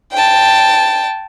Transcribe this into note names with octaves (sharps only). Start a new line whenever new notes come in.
G5 A5